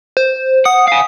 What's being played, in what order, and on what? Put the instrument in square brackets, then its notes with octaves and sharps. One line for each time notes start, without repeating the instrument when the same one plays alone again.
[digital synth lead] C5
[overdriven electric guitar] F#5 [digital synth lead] D#6
[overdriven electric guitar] F5 G#5